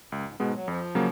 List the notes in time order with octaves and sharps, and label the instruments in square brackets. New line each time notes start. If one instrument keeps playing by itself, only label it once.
[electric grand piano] C#2 [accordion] F#2
[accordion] G#2
[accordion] G#2 [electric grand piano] B2 G#3 B3
[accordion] F#3
[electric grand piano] F2 [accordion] F3
[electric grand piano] C#3 F#3 A#3